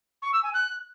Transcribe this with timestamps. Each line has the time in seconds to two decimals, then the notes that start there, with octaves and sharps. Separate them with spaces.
0.22 C#6
0.32 E6
0.43 G#5
0.53 F#6